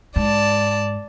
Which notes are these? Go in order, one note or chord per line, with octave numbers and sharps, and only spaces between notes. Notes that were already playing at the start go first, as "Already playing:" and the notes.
G#2 D5 A5